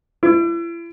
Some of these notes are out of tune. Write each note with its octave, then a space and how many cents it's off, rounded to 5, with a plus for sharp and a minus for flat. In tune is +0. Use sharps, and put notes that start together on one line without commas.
E4 +40